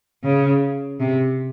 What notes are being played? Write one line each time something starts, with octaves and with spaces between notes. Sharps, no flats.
C#3
C3